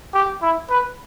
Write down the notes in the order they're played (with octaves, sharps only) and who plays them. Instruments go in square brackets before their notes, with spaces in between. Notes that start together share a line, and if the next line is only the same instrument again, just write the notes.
[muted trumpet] G4
E4
B4